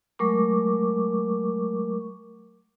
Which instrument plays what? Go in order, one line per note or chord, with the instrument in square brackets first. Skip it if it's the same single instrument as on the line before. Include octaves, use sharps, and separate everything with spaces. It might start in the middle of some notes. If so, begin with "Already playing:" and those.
[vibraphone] F#3 G#3 A3 A#4 C#6 D6